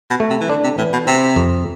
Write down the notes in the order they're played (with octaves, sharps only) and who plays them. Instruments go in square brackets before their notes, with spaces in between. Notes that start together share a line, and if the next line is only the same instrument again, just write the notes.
[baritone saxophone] B2
[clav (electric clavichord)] A3
[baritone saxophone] C3
E3
[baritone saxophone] D3 [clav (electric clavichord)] D4
[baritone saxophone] C3
[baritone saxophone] A2 [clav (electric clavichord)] E3
[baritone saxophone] B2
[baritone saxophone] C3 [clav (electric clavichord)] C4
[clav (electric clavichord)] F2